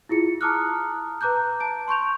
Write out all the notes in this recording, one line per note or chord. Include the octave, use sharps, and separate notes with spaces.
E4 F4 G#4 C#7
A5 A#5 D6 D#6 F6 F#6
B4 A#5 D6 F#6 G6
A5 D7
C6 C#6 G6 F7